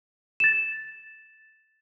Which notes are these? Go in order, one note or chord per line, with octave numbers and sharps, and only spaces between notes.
A6 E7